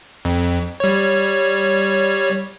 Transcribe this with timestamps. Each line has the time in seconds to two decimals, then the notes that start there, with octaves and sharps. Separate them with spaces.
0.25 F2
0.80 G3 C#5